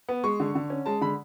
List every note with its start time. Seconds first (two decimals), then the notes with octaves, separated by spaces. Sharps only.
0.09 B3
0.24 G#3 C#6
0.40 D3
0.55 D3
0.70 C#4
0.86 G#3 A5
1.01 D3 B5